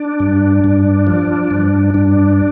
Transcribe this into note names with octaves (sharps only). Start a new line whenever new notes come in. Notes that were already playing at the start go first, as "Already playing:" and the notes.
Already playing: D4
G2
G2
F3
G2
G2 D4